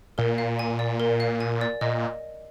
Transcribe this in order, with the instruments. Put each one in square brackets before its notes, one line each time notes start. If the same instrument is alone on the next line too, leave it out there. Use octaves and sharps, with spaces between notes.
[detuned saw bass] A#2 [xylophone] A#4
[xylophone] F5
G#5
D5
A#4
F5
G#5
D5
[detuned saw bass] A#2 [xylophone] D#5